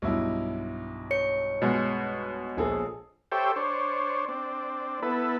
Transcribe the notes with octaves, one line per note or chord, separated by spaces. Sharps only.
B1 G2 E4
C#5 C#7
B2 G#3
A#1 G#4 A4
G4 A4 C5 C#5 E5 G5
D4 C5 C#5
C4 D4
B3 E4 A4 B4